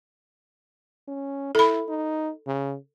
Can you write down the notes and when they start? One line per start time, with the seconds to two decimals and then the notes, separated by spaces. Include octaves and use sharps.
1.08 C#4
1.55 E4 A4 B5
1.88 D#4
2.46 C#3